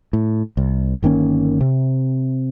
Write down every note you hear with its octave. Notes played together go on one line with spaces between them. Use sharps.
A2
C2
G1 D#3 A#3 C#4
C3